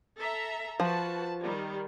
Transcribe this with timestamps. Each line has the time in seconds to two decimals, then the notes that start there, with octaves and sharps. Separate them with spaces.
0.18 A4 E5 A#5
0.80 F3 F#4 B4 A5
1.43 D#3 G3